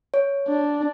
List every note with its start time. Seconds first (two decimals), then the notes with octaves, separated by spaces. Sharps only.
0.14 C#5
0.48 D4